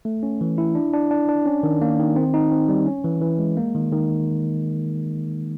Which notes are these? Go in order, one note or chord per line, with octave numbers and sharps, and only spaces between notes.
A3
C#4
E3
E4
D4
D4
D4
D4
C#4
D#3
A#3
D#3
C4
D#4
C4
G3
C#4
E3
E3
G#3
A#3
D#3
D#3